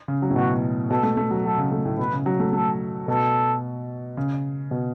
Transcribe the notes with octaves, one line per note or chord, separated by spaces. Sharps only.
C#3
F#3
A2
B2 F#4
B2 A4
A3
A3
F#3
F#3 A4
C#3
A3
A2
B2 B4
C#3
F#3
A3
A3 A4
B2 A4
C#3
B2